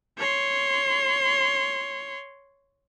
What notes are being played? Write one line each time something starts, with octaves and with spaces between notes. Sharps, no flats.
C#5 C6